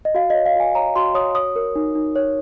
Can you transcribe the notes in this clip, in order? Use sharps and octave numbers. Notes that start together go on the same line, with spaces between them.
D#5
F#4 F5
C#5 D#5
F5
F#4 G#5
C#5 A#5
F#4 C6
C#5 D#6
C#5 D#6
A#4
D#4
D#4
C#5